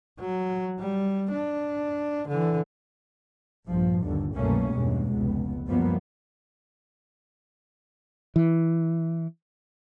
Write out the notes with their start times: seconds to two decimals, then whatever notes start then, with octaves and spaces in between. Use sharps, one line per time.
0.20 F#3
0.79 G3
1.31 D4
2.28 D3 E3
3.68 A#1 G2 F3
4.03 G1 D#2 D3
4.35 C2 F#2 B2 A3 A#3 C#4
4.75 E2 G2 B2 G#3 A#3
5.14 F1 C#2 B3
5.67 F#2 F3 G3 A#3 B3
8.36 E3